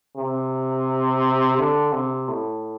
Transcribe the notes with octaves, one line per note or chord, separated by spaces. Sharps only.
C3
D3
C3
A2